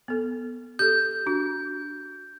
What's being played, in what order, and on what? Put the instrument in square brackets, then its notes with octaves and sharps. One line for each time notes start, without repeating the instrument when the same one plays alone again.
[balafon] B3 A4
[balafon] G4 A4 [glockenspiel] G6
[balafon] D4 F#4